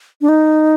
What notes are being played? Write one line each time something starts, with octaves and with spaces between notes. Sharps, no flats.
D4
D#4